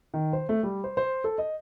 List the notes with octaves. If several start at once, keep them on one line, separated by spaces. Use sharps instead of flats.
D#3
C5
A3
G3
C5
C5
A4
D#5